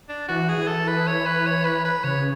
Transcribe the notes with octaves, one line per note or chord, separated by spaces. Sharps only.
D4
E3 F#4
G#4
E3
A4
B4
C#5
B4
C#5
B4
B4
C#3 C#5